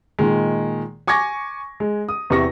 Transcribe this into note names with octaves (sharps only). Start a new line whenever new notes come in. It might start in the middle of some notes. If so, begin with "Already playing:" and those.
A#2 D#3 G#3
G#5 C#6 D6 G#6 A#6
G#3
D#6
E2 C3 C#6 A#6